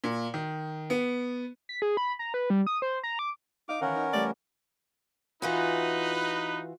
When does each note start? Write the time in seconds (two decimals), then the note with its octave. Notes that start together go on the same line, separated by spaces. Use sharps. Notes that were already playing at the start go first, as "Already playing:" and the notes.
0.04 A#2
0.34 D#3
0.90 B3
1.69 B6
1.82 G#4
1.97 B5
2.19 A#5
2.34 B4
2.50 G3
2.67 D#6
2.82 C5
3.04 A#5
3.19 D6
3.69 D#4 D#5 F5 D6
3.82 D#3 E3 C#4 A#4 F#5
3.95 D#4
4.13 E3 G3 A3 D5
5.42 E3 D#4 F4 F#4 B4